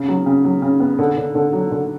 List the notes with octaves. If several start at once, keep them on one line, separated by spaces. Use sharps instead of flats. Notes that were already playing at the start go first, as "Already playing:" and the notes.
Already playing: C#3
F#3
C#3
F#3
C#3
B3
D3
D3
D3
F#3
D3